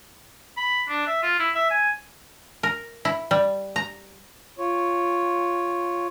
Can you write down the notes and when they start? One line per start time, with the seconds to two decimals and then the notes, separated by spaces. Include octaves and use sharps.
0.57 B5
0.89 D4
1.07 E5
1.23 F4
1.39 E4
1.55 E5
1.71 G#5
2.63 A#4
3.05 E4
3.31 G3
3.76 A#5
4.58 F4 C#5